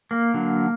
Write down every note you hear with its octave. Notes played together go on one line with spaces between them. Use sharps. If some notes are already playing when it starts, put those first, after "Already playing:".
A#3
D3 F#3